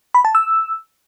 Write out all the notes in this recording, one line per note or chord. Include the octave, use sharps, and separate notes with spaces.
B5
A5
E6